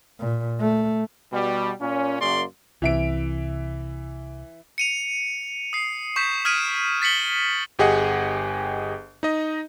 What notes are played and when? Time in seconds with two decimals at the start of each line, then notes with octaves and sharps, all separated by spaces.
0.20 A#2
0.60 A3
1.32 B2 G3
1.81 A#2 C#4
2.20 F#2 C#3 A#3 D5 C6
2.82 C2 C3 E3 E5 D7
4.78 C#7 D#7 F7
5.73 D#6 C7
6.16 C#6 G6 B6 E7
6.45 D#6 F6 G#6 B6 D7 D#7
7.02 A6 B6 C#7 F#7 G7
7.79 G1 G4 G#4 D#5 F#5
9.23 D#4 D#5